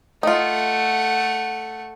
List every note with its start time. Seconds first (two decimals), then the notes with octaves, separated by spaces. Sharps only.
0.23 A3 D#4 F4 F#5